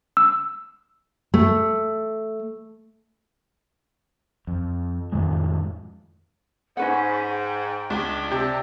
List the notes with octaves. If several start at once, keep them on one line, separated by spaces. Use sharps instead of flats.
E6
A3
F2
F2 A2 D#3 G#3
G#2 C#4 D#4 G#4 B4 F#5 B5
G5
C#2 D4
C3 G4 D5 G5 E6